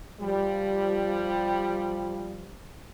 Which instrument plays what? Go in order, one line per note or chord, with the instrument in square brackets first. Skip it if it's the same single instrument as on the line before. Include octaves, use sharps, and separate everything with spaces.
[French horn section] F3 G3